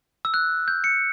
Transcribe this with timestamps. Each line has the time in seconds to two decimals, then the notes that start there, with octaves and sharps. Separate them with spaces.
0.25 E6
0.34 F#6
0.68 G6
0.84 C#7